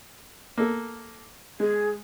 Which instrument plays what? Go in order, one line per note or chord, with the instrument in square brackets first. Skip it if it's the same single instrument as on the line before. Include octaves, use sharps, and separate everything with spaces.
[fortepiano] A#3 A4
[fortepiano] G#3 [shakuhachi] G#4